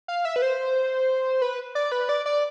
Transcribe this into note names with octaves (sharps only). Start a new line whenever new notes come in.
F5
E5
B4
C5
B4
D5
B4
D5
D5